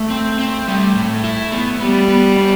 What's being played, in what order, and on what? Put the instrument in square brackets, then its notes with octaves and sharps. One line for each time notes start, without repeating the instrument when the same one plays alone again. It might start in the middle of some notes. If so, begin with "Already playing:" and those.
Already playing: [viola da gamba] A3
[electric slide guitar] C4
C4
[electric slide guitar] G3 [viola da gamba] A3
[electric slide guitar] A2
E4
B3
[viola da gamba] G3 [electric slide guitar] B3
[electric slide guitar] B3
D4